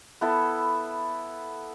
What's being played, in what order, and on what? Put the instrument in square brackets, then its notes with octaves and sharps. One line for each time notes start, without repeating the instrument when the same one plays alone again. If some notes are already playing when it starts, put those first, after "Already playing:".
[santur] B3 E4 A4